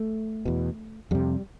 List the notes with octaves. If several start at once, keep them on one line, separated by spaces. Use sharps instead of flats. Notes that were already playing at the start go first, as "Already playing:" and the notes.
Already playing: A3
E2 B2
F2 C3 G3